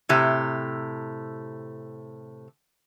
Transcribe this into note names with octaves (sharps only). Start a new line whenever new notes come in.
A2 C3 G4